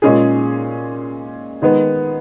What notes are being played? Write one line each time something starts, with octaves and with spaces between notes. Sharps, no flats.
A#2 G#3 C#4 G#4
D#3 G#3 B3